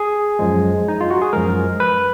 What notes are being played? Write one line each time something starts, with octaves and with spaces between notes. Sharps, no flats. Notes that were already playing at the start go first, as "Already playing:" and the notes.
Already playing: G#4
F#2 F3 G#3
D#4
F4
F#4
G#4
F#2 F3 G#3 A#4
B4